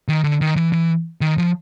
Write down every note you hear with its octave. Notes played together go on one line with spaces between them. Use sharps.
D#3
D3
D#3
E3
E3
D#3
F3